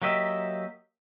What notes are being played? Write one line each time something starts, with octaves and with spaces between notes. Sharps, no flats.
F#3 A#3 G4 D#5 E5